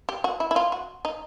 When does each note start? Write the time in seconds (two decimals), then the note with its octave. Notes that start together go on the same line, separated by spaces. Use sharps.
0.09 G4
0.24 F#4
0.40 E4
0.51 E4
0.56 F4
0.72 F#4
1.05 D#4